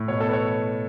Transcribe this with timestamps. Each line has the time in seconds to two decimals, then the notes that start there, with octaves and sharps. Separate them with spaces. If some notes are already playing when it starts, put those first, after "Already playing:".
Already playing: A2
0.08 B2 C#5
0.20 A4
0.28 B4
0.33 C#5